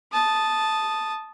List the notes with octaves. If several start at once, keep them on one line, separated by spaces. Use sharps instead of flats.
A5 D#6